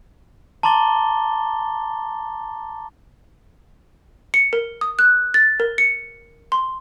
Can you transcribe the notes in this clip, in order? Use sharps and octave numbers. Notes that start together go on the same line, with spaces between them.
A5 A#5 C6 D6 A6 G7
C#7
A#4
D#6
F#6
A6
A#4
C#7
C6